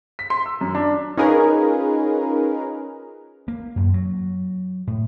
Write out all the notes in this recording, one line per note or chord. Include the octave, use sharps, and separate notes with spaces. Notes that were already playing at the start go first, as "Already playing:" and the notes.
B6
C6
E6
F#2
D4
C#4 D#4 F4 G#4 A#4 B4
A#3
F#2
F#3
A2